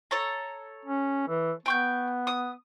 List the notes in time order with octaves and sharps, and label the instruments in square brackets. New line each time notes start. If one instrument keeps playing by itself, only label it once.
[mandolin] A4 C#5 A#5
[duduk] C#4
E3
[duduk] B3 [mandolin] G5 C#6 G6
[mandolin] D#6